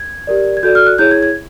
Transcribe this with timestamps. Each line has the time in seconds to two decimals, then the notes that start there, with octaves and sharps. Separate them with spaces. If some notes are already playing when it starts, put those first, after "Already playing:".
Already playing: G#6
0.27 G4 A#4 D5
0.57 G#6
0.63 F#4 A4 D5 G6
0.75 F6
0.87 F#6
0.99 E4 G#4 C#5 G6
1.11 G#6
1.23 G#6